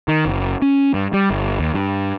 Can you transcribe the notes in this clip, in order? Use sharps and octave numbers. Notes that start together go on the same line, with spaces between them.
D#3
F#1
C#4
G2
G3
G1
D#2
G2